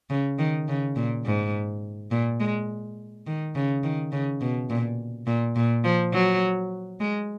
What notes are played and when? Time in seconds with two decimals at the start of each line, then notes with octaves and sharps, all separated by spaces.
0.10 C#3
0.39 D#3
0.68 C#3
0.96 A#2
1.25 G#2
2.11 A#2
2.40 G#3
3.27 D#3
3.55 C#3
3.84 D#3
4.12 C#3
4.41 B2
4.70 A#2
5.27 A#2
5.56 A#2
5.84 F3
6.13 F#3
7.00 G#3